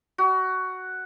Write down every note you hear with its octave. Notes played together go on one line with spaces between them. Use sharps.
F#4